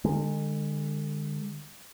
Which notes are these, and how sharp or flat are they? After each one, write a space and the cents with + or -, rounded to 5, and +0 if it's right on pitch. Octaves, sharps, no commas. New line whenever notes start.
D3 +30 G#3 -25